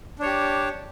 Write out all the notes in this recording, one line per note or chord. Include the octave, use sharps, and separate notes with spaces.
D4 G4 C#5